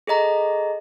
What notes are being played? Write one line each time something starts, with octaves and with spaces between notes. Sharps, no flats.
G#4 A4 D#5 A#5